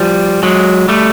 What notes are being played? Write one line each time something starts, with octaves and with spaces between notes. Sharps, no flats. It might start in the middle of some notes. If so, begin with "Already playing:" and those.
Already playing: F3 G3
F#3 G#3
G3 A3